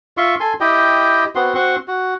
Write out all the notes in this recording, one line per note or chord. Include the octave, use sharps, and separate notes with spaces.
F4 E5 C6 C#6
A4 G#5 C6
E4 G4 D#5 G5
B3 C4 F#4 C6
C4 F#4 C6 C#6
F#4